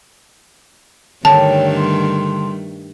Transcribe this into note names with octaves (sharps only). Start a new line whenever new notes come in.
G2 D3 D#3 A3 C#5 G5 A5
G3 C6